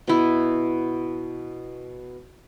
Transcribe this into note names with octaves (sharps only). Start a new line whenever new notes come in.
B2 E4